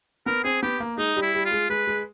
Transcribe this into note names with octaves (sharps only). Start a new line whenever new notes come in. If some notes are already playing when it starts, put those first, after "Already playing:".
B3 A#4
C4 G#4
B3 G4
A#3
G#3 D#4
G3
E4
G3
F4
G#3
G#3 B4
G#3